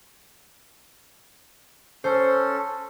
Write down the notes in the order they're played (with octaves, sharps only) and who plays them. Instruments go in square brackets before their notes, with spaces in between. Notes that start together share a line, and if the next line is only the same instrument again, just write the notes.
[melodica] C#4 A4 [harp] C5